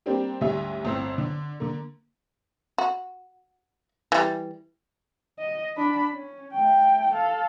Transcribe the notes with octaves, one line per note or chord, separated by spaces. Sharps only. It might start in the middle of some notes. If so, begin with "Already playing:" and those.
G3 A#3 C4 D4 G4
D2 G#2 G3 C#4 E5
G1 A2 C4 C5 E6
D3
D3 A#3
F#4
E3 G3
D#5
D4 B5
C#4
A3 G5
A4 F5